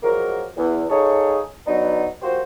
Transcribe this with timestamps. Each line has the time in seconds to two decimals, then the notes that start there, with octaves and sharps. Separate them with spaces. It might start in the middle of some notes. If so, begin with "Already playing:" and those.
0.03 F3 F#3 G#3 A#3 F#4 A#4
0.57 E2
0.90 D#4 F4 G#4 A4 C#5
1.67 F#3 B3 D4 D#4
2.22 F3 A#3 F#4 G4 C5